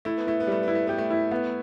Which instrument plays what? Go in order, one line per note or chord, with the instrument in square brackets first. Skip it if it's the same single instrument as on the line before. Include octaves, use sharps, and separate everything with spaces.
[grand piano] A3 [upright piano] E4
[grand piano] B3
[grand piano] A3 [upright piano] E4
[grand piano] B3
[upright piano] G3 [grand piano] A3
[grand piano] B3 [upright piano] E4
[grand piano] A3
[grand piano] B3 [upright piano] G4
[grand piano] A3
[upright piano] E4
B3